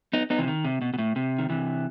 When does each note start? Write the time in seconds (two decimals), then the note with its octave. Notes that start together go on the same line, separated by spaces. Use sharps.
0.13 B3 D#4
0.30 B3 D#4
0.39 C3 E3
0.47 D#3
0.65 C3
0.82 B2
0.94 B2
0.98 A2
1.16 C3
1.39 D#3
1.49 C3 E3